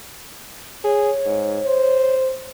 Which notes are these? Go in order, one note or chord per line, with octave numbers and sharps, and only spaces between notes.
G#4 C#5
G#2
C5